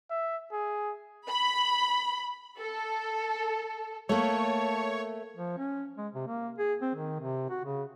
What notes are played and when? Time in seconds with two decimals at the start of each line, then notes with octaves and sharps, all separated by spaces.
0.10 E5
0.52 G#4
1.28 B5
2.57 A4
4.09 A3 A#3 C#5 A5
5.35 F3
5.58 C#4
5.97 G#3
6.14 C3
6.27 A#3
6.58 G#4
6.82 C4
6.95 D#3
7.20 C3
7.50 F#4
7.64 C#3